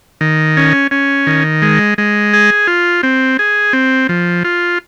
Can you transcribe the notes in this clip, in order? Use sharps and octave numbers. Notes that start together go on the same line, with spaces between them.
D#3
C#4
C#4
D#3
G#3
G#3
G#4
F4
C4
G#4
C4
F3
F4